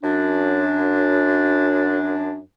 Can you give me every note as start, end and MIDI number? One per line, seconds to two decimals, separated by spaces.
0.03 2.39 42
0.03 2.39 62